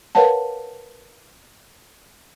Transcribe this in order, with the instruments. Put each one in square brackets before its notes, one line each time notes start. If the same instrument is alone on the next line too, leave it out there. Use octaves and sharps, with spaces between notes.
[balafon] A#4 B4 C#5 F5 F#5 A5